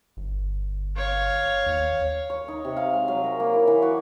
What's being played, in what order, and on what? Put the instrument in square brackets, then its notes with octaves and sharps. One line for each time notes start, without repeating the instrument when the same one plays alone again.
[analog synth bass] G1
[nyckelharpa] C#5 F5
[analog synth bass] D#2
[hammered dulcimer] C#5
D#4
C3
F5
G#3
F#3
A#4
A#3
E4
E3
F#4